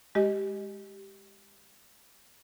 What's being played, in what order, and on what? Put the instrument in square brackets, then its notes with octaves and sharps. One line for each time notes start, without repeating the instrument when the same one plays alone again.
[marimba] G#3 G4 D#5